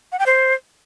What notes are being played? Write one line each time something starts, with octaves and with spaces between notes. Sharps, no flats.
F#5
G5
C5